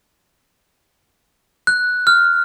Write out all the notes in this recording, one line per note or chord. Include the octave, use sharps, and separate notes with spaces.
F#6
F6